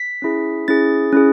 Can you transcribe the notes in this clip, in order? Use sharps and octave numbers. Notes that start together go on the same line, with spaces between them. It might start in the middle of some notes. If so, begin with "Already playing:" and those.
Already playing: B6
C#4 E4 G#4
C#4 E4 G#4 A6
C#4 E4 G#4